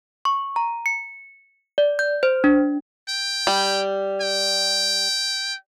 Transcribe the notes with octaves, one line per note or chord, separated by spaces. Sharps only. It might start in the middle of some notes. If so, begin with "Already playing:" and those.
C#6
A#5
C#7
D5
G6
C5
D4
G5
G3
G5